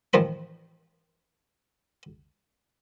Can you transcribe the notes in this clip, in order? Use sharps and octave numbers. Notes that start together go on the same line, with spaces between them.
A1 D#3 F3 C4 B5